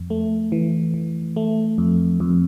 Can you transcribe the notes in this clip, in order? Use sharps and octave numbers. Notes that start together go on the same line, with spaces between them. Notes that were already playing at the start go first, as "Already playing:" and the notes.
Already playing: F2
A3
E3
E3
A3
F2
F2